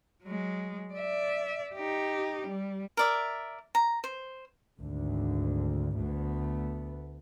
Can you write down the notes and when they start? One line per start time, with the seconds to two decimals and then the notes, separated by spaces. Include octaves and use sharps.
0.23 F#3 G#3
0.94 D5 E5
1.75 D#4 G4
2.47 G3
2.97 A#4 D5 E5
3.75 A#5
4.04 C5
4.80 G#1 D2 D3
5.96 D2 A3 B3